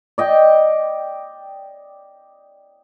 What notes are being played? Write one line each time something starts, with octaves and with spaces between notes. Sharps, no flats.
D5 D#5 G5